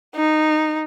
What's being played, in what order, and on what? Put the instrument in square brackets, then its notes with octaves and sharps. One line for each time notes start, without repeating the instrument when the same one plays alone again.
[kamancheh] D#4